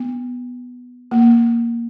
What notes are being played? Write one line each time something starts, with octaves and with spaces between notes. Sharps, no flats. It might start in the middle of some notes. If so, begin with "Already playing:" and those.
Already playing: B3
A#3